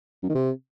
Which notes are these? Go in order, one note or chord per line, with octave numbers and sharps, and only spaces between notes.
F#2
D#3
C3